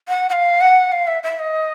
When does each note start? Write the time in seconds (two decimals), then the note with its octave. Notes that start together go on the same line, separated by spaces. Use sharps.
0.08 F#5
0.29 F#5
0.33 F5
0.61 F#5
0.92 F5
1.07 E5
1.23 E5
1.39 D#5